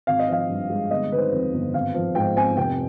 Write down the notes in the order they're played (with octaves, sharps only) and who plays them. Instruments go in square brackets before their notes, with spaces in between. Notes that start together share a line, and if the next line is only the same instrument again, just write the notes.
[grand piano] G#1 F5
D#5
F3 F5
G2
G#3
G1 D#5
D#3 B4
C5
F2
G1
G#1 F5
F3
G#2 G5
C4 G#5
F1 G5